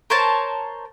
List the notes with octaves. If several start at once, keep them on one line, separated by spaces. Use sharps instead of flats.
A#4 C5 C#5 A5